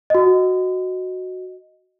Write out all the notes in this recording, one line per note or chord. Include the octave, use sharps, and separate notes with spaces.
F#4 D#5